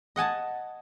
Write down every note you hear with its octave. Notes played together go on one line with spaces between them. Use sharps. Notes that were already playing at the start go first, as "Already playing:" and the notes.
D#5 F#5 G#5 A5